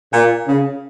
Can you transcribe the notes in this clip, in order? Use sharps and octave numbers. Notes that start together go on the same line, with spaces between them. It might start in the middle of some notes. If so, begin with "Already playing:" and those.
A#2
C#3